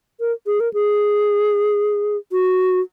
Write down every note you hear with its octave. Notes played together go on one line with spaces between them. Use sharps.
A#4
G#4
A#4
G#4
F#4